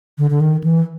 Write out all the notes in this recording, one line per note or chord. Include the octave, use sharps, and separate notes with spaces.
D3
D3
D#3
E3